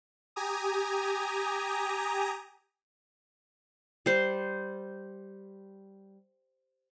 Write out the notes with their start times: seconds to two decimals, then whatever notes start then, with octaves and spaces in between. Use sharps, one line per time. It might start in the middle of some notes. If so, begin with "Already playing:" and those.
0.36 G4 G#5 A#5 D#6
4.06 G3 C5